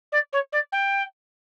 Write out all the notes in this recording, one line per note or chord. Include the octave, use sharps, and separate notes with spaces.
D5
C#5
D5
G5